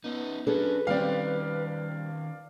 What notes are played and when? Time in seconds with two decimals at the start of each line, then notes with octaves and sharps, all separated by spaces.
0.04 B3 C#4 D#4
0.47 F#3 C#4 D4 G#4 A4 B4
0.87 D#3 G3 C4 C#4 D5 F5